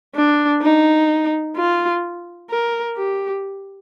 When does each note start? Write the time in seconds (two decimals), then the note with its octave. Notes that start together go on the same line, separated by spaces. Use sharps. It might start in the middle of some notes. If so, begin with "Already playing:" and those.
0.15 D4
0.62 D#4
1.56 F4
2.50 A#4
2.97 G4